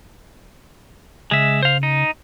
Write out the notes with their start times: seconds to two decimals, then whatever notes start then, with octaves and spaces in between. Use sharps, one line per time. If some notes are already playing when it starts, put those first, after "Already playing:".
1.31 C#3 G#3 E5
1.63 C5 F5
1.83 D#4